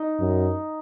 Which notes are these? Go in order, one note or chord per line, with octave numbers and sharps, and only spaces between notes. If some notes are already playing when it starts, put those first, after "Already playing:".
Already playing: D#4
F#2